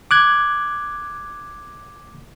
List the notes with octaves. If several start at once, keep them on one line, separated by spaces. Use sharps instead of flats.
D6 F#6 G#6